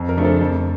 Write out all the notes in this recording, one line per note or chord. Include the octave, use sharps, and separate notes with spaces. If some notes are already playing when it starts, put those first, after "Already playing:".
Already playing: F2
A#4
C#3 F3 A3 D4
A4
F2